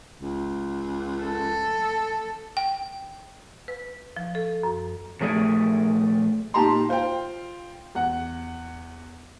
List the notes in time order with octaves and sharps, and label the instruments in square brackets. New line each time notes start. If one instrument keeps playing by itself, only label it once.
[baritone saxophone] C#2
[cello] A4
[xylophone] G5
[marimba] B4
F3
A4
F#2
[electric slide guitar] A#2 F3 A3 G#4 D5
[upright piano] A#2 D#4 G4 A5 A#5 C6
F4 C5 F5 G5
E2 F#5